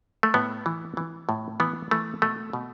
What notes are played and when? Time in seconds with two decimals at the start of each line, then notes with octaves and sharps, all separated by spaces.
0.23 A3
0.34 A2 B3
0.66 E3
0.97 E3
1.29 A2
1.60 E3 B3
1.91 E3 A3
2.22 B2 A3
2.53 B2